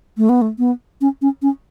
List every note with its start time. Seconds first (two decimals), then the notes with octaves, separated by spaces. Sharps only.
0.17 A3
0.29 B3
0.42 A3
0.59 B3
1.01 C#4
1.22 C#4
1.42 C#4